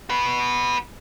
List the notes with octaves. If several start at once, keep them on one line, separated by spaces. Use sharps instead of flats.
F#4 B4